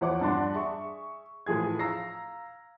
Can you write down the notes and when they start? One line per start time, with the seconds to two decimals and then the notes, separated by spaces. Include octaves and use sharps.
0.01 E2 F3 C#5 F#5 D6
0.21 G2 D4 D5 F#5 C6
0.54 G#4 E5 C#6
1.46 A2 E3 F3 G#4 G#6
1.79 F5 A#5 E6 A#6 C7